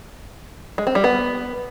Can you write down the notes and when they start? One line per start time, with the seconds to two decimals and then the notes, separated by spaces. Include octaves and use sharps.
0.78 G#3
0.87 C4
0.95 G3
1.04 B3